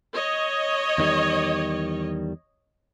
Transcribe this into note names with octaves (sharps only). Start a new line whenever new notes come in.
C#5 D#5
E2 D#3 G3